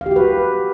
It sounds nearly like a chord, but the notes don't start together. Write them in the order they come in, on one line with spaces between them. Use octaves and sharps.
F5 G4 F#4 B4